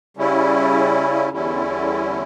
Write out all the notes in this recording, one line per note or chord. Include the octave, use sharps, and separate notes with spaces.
C#3 G3 C#4 E4
E2 D3 G3 C#4 E4